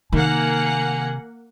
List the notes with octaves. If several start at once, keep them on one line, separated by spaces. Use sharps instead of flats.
C3 D#3 A#3 F#5 G#5